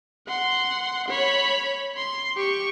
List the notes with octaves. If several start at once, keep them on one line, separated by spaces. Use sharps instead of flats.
F#5 C6
C#5 B5
C6
G4 C#6